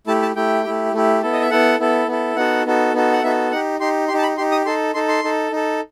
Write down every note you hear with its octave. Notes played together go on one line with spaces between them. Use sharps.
A3 E4 G4 A5
A5
A3 E4 G4 G5
A3 E4 G4
A3 E4 G4
B3 E4 A4
D#5
E5
B3 E4 A4 F#5
B3 E4 A4
B3 E4 A4
B3 D#4 F#4 A4 F#5
B3 D#4 F#4 A4
B3 D#4 F#4 A4
F#5
B3 D#4 F#4 A4 E5
D#4 G4 F#5
D#4 G4 C6
G4 C6
D#4 A5
B5
D#4 G4 C6
D#6
D#4 A4 C6
D#4 A4 C6
C6
D#4 A4
D#4 A4